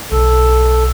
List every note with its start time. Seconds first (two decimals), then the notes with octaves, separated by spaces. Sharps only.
0.12 B1 A4